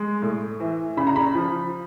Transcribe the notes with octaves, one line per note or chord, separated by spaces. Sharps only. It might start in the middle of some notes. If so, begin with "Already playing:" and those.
Already playing: G#3
A2
E3
C#3 B5
A#5
B5
F3